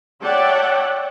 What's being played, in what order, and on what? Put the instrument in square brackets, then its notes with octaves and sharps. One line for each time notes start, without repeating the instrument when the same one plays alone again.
[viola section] C#5 D5 E5 F#5 G5 A5